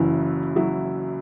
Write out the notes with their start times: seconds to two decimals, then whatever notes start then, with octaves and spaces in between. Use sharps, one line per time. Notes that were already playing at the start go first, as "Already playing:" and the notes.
Already playing: F#1 F#2 E3 F#3 E4
0.56 F#3 E4